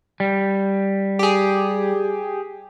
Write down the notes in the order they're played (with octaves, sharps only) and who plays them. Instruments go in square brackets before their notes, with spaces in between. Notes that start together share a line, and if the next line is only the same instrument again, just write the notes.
[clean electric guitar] G3
[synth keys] G4 G#4